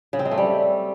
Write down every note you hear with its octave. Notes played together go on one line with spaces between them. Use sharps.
C#3
C4
G#3
A3
G3